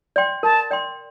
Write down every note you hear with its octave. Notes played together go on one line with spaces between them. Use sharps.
D5 G5 C6
A#4 A5
D5 G5 C6